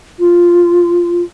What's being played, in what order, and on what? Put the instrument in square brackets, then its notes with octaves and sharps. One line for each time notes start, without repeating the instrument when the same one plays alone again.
[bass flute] F4